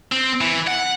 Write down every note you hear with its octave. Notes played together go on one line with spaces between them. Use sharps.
C4
E3
F#5